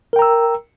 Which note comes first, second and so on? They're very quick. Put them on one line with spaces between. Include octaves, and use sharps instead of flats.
A#4 G5 A#5 E6